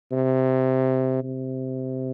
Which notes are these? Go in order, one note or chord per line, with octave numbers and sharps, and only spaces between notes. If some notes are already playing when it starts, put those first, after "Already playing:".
C3
C3